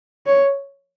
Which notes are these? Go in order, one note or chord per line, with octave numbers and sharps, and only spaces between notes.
C#5